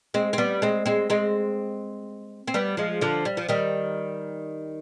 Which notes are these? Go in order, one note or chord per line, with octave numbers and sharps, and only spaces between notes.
G#3 C4
C4
G3 B3
G#3 C4
G#3 C4
G#3 C4
C4
G3 B3
F3 G#3
D3 F3
G3
F3
D#3 G3